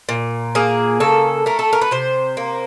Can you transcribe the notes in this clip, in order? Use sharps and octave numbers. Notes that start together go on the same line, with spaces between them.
A#2
A#3 G#4
C#3 A4
A3 A#4
A4
A#4
B4
C3 C5
A#3